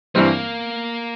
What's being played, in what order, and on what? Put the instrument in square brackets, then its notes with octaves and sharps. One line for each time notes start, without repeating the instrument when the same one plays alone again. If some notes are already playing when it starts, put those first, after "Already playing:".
[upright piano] G2 E3 G3 C4 [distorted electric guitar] A#3